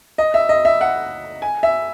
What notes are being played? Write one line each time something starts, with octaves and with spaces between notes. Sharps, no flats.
D#5
E5
D#5
E5
F#5
G#5
E5